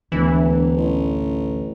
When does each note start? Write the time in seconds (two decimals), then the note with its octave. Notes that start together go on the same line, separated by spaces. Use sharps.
0.12 E1 D2 E3
0.76 A1